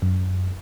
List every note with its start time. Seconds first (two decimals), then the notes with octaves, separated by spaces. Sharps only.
0.02 F#2